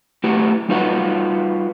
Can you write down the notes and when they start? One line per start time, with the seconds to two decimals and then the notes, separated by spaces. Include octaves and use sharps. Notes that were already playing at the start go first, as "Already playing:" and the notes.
0.24 A3 E4 F#4 G4 B4
0.69 G3 D#4 F4 F#4 B4 F#5